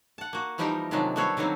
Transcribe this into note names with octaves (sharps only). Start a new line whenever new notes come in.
F#5 A5
A#3 F#4
E3 F3 G3 D#4 G4 A#4
C3 D#3 F3 F#3 G#3 D4
G3 B3 F#4 A4 C5 C#5
D3 D#3 F#3 A#3 C4